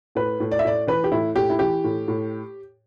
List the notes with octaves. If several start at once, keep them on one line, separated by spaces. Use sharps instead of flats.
A2 B4
A2
D5
E5
A2 D5
E3 B4
G4
A2 E4
A2 G4
E4
E3 G4
A2
A2